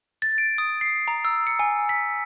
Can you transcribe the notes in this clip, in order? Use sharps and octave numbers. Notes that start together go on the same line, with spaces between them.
A6
D7
D#6
C7
A#5
E6
C#7
G#5
B6